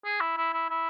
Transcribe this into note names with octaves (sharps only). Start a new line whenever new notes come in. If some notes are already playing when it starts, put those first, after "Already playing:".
G#4
E4
E4
E4
E4